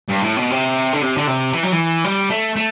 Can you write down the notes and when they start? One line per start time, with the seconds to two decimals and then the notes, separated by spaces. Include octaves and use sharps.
0.09 G2
0.22 A2
0.37 B2
0.50 C3
0.93 D3
1.01 C3
1.17 D3
1.27 C3
1.53 E3
1.63 F#3
1.72 E3
2.04 G3
2.30 A3
2.56 A3